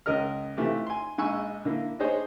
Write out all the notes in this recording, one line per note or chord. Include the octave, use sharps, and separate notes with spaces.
C#2 A#4 D#5 F6
C3 E3 A3 F4 G4
G#5 C6
A#1 G#3 G#5 B5 C#6 E6
D3 A#3 E4
D4 D#4 G#4 C5 C#5